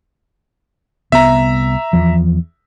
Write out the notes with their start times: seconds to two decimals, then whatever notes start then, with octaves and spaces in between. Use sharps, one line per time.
1.12 C2 B3 E5 A#5
1.93 E2 F3